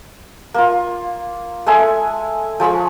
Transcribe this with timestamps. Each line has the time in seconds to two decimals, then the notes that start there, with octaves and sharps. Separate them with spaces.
0.54 A#3 F4
1.66 G#3 A4 E5 G#5
2.60 F3 G#3 B5 C#6